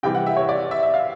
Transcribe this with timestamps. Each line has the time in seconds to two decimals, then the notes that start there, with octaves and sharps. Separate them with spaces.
0.03 C3 E3 G3 G5
0.15 F#5
0.26 E5
0.37 C#5
0.49 D5
0.71 E5
0.83 E5
0.94 F5